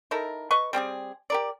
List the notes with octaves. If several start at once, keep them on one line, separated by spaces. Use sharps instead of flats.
D#4 E4 A4 A#4
B4 D#5 C#6
G3 C4 G4 G#4
G4 A#4 D5